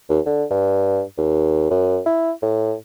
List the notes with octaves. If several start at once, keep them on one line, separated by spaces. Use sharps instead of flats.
D#2
D3
G2
D#2
F#2
E4
A2